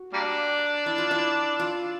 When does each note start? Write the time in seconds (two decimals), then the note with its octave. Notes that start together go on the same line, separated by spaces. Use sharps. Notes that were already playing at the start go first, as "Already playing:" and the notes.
Already playing: F#4
0.13 G3 A#3 D4
0.86 E4
0.98 F4
1.11 E4
1.60 F4